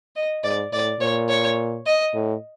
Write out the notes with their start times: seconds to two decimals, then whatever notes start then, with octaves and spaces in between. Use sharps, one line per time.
0.16 D#5
0.44 G#2 D5
0.73 A2 D5
1.00 A#2 C#5
1.29 C#5
1.86 D#5
2.14 A2